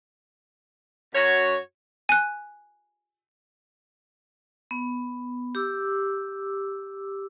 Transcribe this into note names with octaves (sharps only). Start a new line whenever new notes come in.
F#2 F#4 C#5
G#5 F#6
B3
G4 D6 E6